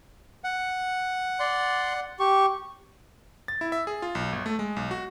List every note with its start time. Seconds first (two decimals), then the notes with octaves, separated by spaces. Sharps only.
0.44 F#5
1.40 D5 C6
2.20 G4 C#6
3.48 A6
3.61 E4
3.72 E5
3.87 G#4
4.02 F4
4.15 B1
4.33 G1
4.46 A3
4.59 G#3
4.76 B1
4.91 F#4